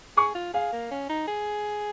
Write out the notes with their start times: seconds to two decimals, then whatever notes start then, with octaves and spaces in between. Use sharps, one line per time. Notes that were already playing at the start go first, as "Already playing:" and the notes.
0.17 G#4 C#6
0.35 F4
0.53 G#4 F5
0.72 A#3
0.91 C#4
1.09 D#4
1.27 G#4